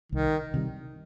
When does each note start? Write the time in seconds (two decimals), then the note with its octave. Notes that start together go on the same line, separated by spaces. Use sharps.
0.12 C2 D#3
0.54 C3 D#3 G3